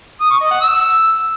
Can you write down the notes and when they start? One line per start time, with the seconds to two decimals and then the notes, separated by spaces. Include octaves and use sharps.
0.20 D#6
0.31 C#6
0.41 D#5
0.51 F#5
0.61 E6